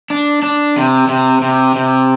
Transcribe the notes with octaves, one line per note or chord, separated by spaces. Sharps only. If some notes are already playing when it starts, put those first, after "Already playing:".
D4
D4
C3
C3
C3
C3